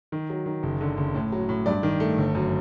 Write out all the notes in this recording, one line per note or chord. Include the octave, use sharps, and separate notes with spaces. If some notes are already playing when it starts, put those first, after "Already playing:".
D#3
F#3
D#3
F#1
D3
F#1
A2
F#3
A2
G2 D5
D#3
A3
G1
F#2